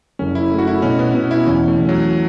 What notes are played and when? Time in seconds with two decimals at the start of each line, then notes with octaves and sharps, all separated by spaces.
0.19 F#1 C#4
0.35 E4
0.52 A3
0.58 F#4
0.67 E4
0.82 B2 C#4
0.99 B3
1.14 B2 B3
1.31 E4
1.46 E2 C#4
1.68 A3
1.78 E2
1.89 F#3